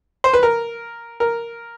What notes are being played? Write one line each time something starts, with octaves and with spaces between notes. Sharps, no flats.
C5
B4
A#4
A#4